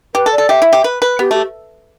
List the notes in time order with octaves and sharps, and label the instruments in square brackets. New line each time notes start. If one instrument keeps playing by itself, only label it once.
[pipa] G4 [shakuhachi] B4
[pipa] A4
[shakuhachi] D5
[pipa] A4
[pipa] G4 [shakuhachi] E5
[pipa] E4
G4
B4
B4
[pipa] B3 [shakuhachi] G4
[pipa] A3 [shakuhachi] G4